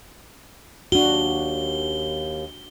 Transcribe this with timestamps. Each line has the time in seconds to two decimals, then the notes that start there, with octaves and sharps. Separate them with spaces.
0.92 D#2 D4 F#4 G7